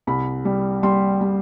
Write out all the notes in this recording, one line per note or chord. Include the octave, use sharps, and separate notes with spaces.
C2 B5
G3
G3 C6
G3